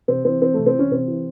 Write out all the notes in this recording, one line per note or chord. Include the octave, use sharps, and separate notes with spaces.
C3 C4
E3 C4
E3 C4
C3 A3
C4
E3 C#4
C3 C4
E3